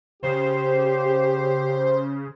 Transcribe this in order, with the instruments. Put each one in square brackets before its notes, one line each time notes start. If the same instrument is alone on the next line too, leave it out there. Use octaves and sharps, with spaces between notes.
[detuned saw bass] C#3 [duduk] G4 [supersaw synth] C5